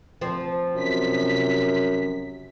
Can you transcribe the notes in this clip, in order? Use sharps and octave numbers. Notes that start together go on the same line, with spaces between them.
F3 C4
F#2 C3 B6